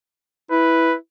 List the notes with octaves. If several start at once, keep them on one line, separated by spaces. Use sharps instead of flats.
E4 B4